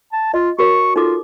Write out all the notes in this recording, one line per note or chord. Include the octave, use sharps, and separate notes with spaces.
A5
F4 D#5
F#4 A#4 C#5 C#6
D#4 F4 A4 D6